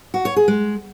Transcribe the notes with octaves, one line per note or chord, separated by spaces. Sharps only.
F#4
C#5
G#4
G#3